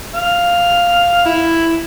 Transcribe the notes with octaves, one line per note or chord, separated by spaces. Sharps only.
F5
E4